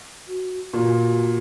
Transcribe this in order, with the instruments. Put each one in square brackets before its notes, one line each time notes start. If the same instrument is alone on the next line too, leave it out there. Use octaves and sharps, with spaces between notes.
[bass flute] F#4
[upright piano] A#2 [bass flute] F#4